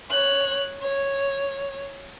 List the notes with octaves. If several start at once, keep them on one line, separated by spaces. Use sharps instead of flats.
C#5 F#6
C#5